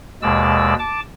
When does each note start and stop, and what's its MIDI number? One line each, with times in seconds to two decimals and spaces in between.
0.22 0.74 39
0.22 0.74 47
0.22 0.74 56
0.22 0.74 74
0.22 0.74 88
0.79 1.00 81
0.79 1.00 86